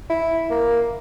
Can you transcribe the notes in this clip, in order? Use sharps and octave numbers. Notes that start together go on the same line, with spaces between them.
E4
A#3